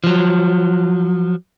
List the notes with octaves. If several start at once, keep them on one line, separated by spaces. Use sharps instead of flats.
F3 F#3